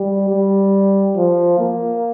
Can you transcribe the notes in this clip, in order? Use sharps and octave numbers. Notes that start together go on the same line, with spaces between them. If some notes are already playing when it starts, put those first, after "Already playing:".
Already playing: G3
G3
F3
A#3